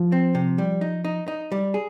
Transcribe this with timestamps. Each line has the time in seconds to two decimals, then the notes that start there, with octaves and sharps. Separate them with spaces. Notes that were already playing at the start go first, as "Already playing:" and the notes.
Already playing: F3
0.12 C4
0.35 C3
0.58 G3
0.81 D#4
1.05 D#4
1.28 D#4
1.52 G3
1.74 G#4